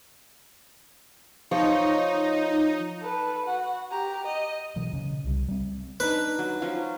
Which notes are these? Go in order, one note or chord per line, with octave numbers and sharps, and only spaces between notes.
F3 D#4 C#5
A4 B4
F#4 F#5
G4 A#5
D#5
B2 E3 F#3
C#3
C2 G3
G3 C4
D4 D#4 B4
F#3
F3 F#3 C#4